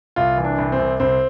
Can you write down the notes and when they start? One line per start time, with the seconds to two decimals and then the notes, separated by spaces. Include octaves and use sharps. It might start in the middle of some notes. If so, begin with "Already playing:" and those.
0.16 C2 F4
0.38 E3
0.45 D4
0.58 C2
0.72 C4
0.79 C2
1.00 C2 C4